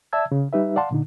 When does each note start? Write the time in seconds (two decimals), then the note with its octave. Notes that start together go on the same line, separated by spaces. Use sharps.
0.13 D5 E5 A5 E6 G#6
0.32 C#3
0.53 G3 D#4 G4 B4 E5
0.76 D5 F5 F#5 A5 C6
0.91 A#2 D3 D#4